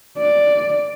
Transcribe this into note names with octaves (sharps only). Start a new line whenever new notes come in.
D5